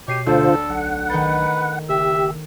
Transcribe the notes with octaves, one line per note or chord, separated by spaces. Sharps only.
B2 G4 C#5 C7 D#7
D2 D3 F4 A4 C5
B1 F#5
D#3 B4 G6 A6
F#1 G4 E5